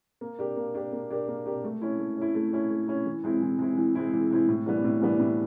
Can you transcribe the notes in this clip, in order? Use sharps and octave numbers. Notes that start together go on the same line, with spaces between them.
A#3
D4 G4 A#4
A#3
D4 G4 A#4
A#3
D4 G4 A#4
A#3
D4 G4 A#4
A3
C#4 E4
A3
C#4 E4
A3
C#4 E4
A3
C#4 E4
E3
G#3 C4 E4
E3
G#3 C4 E4
E3
G#3 C4 E4
E3
G#3 C4 E4
A2
E3 G3 B3 D4
A2
E3 G3 B3 D4
A2